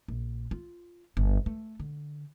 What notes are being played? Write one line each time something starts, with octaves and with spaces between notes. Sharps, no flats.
A#1
F4
G1
A3
D3